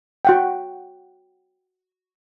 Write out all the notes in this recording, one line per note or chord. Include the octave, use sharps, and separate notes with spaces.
F#4 F#5 G5